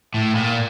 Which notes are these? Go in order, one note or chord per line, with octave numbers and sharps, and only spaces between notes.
A2
A#2